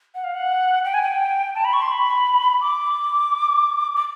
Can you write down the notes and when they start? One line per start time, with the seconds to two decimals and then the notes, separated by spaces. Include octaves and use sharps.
0.15 F#5
0.24 F5
0.34 F#5
0.85 G5
0.94 G#5
1.02 G5
1.55 A5
1.65 B5
1.73 C#6
1.82 C6
1.91 B5
2.61 D6
3.95 D6